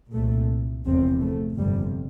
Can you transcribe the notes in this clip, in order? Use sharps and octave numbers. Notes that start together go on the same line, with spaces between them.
C2 A#2 A3
F1 E2 C3 C4
A3
G1 F2 C3 G3